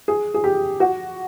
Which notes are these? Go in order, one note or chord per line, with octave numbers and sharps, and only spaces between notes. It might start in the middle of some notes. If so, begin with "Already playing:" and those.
G#4
G#4
G4
F#4